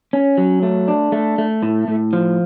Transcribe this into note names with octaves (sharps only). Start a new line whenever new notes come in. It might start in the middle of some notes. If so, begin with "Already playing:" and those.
C#4
F#3
A3
D4
A3
A3
A2
A2
F3